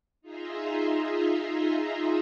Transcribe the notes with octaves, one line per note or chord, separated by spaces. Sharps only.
D#4 F4 G#4 E5 A#5 C6